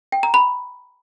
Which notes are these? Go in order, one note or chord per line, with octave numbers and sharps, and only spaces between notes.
G5
A#5
B5